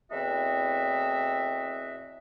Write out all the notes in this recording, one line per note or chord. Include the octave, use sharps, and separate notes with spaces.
E2 A2 C4 F#4 D#5 E5